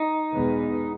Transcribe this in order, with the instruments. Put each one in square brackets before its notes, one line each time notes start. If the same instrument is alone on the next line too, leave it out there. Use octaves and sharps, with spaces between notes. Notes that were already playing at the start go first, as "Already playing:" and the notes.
Already playing: [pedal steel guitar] D#4
[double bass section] E2 B2 G#3 B3